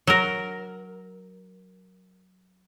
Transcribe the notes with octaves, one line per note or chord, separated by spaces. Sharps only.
F#3 A#4